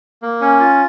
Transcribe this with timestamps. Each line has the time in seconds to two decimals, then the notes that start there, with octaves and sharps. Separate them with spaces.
0.22 A#3
0.41 C#4
0.60 F4